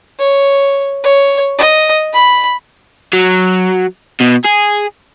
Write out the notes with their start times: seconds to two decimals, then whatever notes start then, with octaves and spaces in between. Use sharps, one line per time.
0.19 C#5
1.04 C#5
1.58 D#5
2.13 B5
3.13 F#3
4.21 B2
4.45 G#4